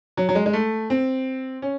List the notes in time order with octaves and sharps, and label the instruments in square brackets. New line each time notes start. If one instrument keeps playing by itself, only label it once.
[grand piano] F#3
F#3
G#3
G#3
A3
C4
C#4